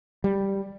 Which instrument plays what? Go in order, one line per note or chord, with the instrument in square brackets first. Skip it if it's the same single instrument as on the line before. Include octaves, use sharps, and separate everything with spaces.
[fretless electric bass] G3